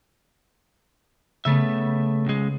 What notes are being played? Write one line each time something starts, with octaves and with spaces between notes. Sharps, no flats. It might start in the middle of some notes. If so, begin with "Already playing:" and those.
C#3 A3 B3 E5
C#2 G#3